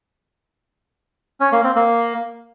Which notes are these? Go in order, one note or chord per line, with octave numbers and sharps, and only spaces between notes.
C#4
A#3
C4
A#3